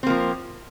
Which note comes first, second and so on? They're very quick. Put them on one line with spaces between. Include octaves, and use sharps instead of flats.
C4 A#3 F3